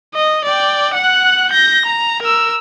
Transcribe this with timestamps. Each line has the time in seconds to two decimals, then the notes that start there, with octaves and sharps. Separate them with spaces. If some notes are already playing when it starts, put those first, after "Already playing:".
0.14 D#5
0.45 D5 G5
0.95 F#5 F#6
1.51 G6 A#6
1.85 A#5
2.22 A#4 E6